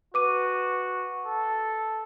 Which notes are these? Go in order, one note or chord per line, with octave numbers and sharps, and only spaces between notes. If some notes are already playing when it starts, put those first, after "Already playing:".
F#4 B4 D6 D#7
A4